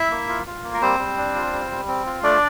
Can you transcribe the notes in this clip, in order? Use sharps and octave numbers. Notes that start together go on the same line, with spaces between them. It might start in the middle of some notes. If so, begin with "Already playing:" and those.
Already playing: E4 E5
A#3
F4
F4
A#3
A#4
G3 C4 C5
G3
D4
F4
G3
G3
C4
F4
A3 D4 D5